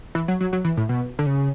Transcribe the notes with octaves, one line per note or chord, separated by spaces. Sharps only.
E3
F#3
F#3
F#3
E3
A2
B2
D3
C#3